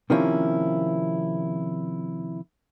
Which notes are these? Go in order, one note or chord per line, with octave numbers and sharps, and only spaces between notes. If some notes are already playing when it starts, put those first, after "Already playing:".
C3 D#3 F3 A#3 C#4 E4